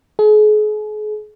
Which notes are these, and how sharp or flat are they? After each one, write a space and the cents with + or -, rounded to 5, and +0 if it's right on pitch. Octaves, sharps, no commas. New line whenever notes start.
G#4 +40